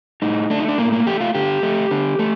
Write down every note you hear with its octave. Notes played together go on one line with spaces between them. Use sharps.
A2 D#4
A3 D4
D#4
D4
A2 A#3
A#3
A3 G4
F4
D3 G4
A3
D3
A3